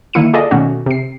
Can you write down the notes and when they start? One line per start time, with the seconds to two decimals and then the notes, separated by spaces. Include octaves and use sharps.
0.13 D3 D#3 A#3 E4 C#7 D#7
0.33 F4 G#4 A4 D5 D#5
0.51 B2 D#3 A3 C#4 F#4
0.86 C3 C7